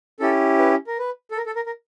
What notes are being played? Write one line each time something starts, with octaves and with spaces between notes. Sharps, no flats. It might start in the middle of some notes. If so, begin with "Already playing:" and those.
C#4 E4 G4 A4
B4
A#4
B4
A4
A#4
A4
A#4
A#4